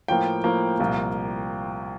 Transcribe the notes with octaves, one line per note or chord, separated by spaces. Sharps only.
A2 F3 A#3 G5
A2 F3 A#3
C2 A#2 F3 A#3